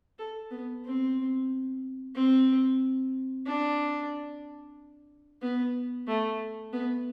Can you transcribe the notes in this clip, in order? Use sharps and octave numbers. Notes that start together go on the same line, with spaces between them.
A4
B3
C4
C4
D4
B3
A3
B3